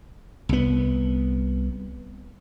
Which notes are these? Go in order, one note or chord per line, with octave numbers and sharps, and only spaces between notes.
C2 B3